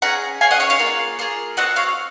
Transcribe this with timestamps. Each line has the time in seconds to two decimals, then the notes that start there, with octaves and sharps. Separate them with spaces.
0.02 C#4 G#4 F#5 A#5
0.41 C#4 G#4 F5 G#5
0.51 D#5 F#5
0.60 C#5 F5
0.70 C#5 F5
0.79 A#3 F4 G#4
1.19 A#3 F4 G#4
1.57 C4 F#4 D#5 F#5
1.76 C#5 F5